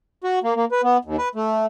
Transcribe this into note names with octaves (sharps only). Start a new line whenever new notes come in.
F#4
A#3
A#3
B4
B3
D#2
B4
A3